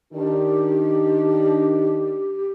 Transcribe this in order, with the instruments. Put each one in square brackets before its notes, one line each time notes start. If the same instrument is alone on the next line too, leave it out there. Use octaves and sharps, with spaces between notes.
[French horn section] D#3 D4 [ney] G4